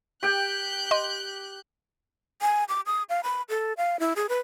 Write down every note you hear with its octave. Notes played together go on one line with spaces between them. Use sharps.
G4 G5 F#6 G6
D#5 C6
G#5
D6
D#6
F5
B5
A4
F5
E4
G#4
B4